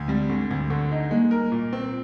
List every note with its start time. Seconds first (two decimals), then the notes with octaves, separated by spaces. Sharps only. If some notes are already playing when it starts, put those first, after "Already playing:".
Already playing: D2
0.08 G3 G#3 C4
0.29 D3 G#3 C4
0.51 D2
0.70 D3
0.91 D#4
1.11 G3 G#3 A#3
1.31 A#4
1.52 A#2
1.73 C4